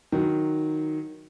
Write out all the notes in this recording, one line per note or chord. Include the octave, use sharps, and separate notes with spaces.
D#3 F#3